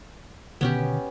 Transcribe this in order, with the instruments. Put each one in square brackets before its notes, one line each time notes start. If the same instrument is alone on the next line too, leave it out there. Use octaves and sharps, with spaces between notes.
[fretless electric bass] B2 D3 D#3 [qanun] B3 C#4 G4